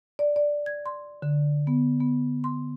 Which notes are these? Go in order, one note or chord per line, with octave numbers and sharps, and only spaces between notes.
D5
D5
G#6
C6
D3
B3
B3
C6